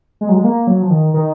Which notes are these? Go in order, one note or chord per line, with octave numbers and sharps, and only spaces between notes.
G#3
F#3
G#3
A#3
F#3
F3
D#3
D#3